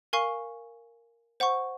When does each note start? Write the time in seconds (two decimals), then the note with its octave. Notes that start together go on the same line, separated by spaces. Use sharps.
0.13 A#4 F5 G#5 C#6
1.40 C5 F#5 C#6